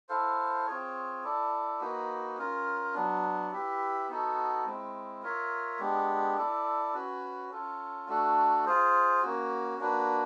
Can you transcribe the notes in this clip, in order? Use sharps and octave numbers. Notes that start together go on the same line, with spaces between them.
E4 A4 C5 F5
C4 F4 G#4 C#5
E4 A4 D5
A#3 D#4 F#4 B4
C#4 F4 A#4
F#3 B3 D4
E4 G4 B4 E5
B3 D#4 F#4 A4
G#3 C4 E4
F4 A#4 C#5 E5
G#3 B3 D4 G4
E4 A4 D5
C#4 F#4 B4
C#4 F4 A4
A3 D4 F#4 A4
F4 G#4 C5
A#3 C#4 F#4
A#3 D4 F#4 B4